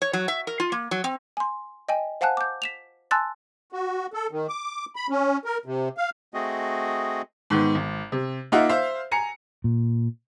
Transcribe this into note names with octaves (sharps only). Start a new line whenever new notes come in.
C#5
F#3
E5
A#4
F4
A#3
F#3
C4
G#5 C6
D#5 G5 G#5
C5 F5 F#5 G#5 A5 F#6
D6 G6
B6 E7 F7
G#5 A5 C6 E6 F#6 A6
F#4
A4
D#3
D6
B5
C#4
A#4
C3
F5
A3 C4 F#4 G#4 D#5
G#2 D#3 B3
G#1
C3
A#3 D#4 F4 D#5 E5 F#5
C5 E5 F5
G#5 A#5 C#7
A#2